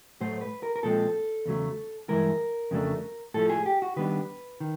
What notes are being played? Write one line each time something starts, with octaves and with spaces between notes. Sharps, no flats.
A2 F#3 A3 C5
B4
A#4
A#4
A#2 F3 G#3 C4 A4
E2 C#3 F#3 A3
G2 E3 G#3 A#4
F2 C#3 F#3 A3 D4
A2 F3 A3 A4
G#4
G4
F#4
D#3 G3 B3 D4 B4
D#3